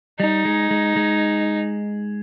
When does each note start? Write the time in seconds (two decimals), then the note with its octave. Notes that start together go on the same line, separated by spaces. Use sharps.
0.20 G3 D#4
0.45 G#3
0.71 G#3
0.96 G#3